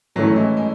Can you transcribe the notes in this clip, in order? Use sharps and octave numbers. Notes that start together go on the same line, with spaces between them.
A2 E3 F#3 A3 C#4 E4
G#3
G#3